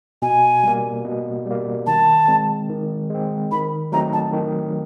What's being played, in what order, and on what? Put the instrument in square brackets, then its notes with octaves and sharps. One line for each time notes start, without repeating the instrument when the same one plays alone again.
[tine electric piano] B2 [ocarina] G#5
[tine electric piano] G3 A#3
B2
G3 A#3
[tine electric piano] D#3 [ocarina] A5
[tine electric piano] G#3 C4
D#3
G#3 C4
[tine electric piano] D#3 [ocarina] B5
[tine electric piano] F#3 A3 C4 D#4 [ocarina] A#5
[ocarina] A5
[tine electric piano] D#3